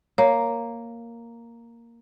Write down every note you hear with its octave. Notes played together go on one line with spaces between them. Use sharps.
A#3 C#5